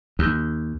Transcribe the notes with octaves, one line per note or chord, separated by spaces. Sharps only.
D#2